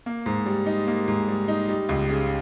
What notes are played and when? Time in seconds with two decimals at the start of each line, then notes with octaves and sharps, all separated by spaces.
0.06 A#3
0.26 G#2
0.46 G3
0.66 D#4
0.87 A#3
1.08 G#2
1.28 G3
1.48 D#4
1.68 G3
1.89 C#2
2.09 C#3